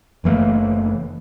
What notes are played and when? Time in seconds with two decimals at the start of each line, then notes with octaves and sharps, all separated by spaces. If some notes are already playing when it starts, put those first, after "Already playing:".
0.24 F#1 E3 A3 A#3